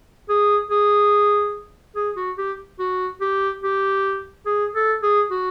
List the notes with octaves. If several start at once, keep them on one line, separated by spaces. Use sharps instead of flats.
G#4
G#4
G#4
F#4
G4
F#4
G4
G4
G#4
A4
G#4
F#4